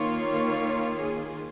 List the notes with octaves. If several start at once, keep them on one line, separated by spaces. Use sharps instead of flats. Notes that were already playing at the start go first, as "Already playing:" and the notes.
Already playing: D#3 A#3 F4 C#5
G#4